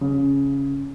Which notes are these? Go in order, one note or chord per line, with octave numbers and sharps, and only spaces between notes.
C#3